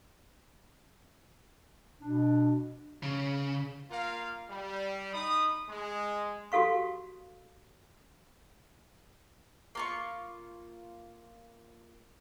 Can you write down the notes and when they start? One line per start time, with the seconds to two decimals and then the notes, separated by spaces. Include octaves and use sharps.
2.01 B2 D4
3.03 C#3
3.90 A#3 F4 A#4 F5
4.50 G3
5.12 D#4 B5 D#6
5.68 G#3
6.52 F#4 G4 A4 F5 C#6
9.75 A#3 F4 C#6